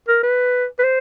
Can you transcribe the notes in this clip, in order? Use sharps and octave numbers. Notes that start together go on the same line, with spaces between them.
A#4
B4
B4
C5